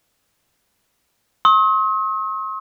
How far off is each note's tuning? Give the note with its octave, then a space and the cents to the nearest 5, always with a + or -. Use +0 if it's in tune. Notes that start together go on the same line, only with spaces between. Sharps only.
C6 +45 D#6 +45